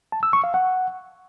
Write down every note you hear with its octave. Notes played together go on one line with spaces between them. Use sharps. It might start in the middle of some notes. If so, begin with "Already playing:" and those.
A5
E6
C#6
F5
F#5